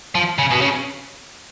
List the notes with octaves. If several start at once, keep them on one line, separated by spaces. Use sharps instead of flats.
F3
C#3
B2
C#3